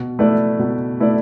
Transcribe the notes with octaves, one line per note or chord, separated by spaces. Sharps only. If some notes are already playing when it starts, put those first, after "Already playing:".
Already playing: B2
A3 E4 B4 D5
B2
A3 E4 B4 D5